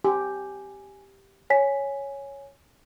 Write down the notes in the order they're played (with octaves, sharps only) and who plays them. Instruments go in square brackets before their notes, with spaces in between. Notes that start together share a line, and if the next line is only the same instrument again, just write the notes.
[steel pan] G4 [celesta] G#5
[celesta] C#5 G#5 B6